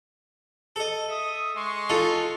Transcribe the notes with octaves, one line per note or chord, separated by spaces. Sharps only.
A4 D#5
E5 D#6
G#3 C6 C#6
D#4 F4 A4